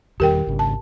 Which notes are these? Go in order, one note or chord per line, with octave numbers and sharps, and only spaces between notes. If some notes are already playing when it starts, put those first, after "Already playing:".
E2 D#3 G3 G4 A#4 G5
G#1 C#3
A5